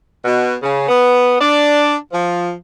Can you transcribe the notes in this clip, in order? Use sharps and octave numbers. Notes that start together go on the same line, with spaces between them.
B2
C#3
B3
D4
F3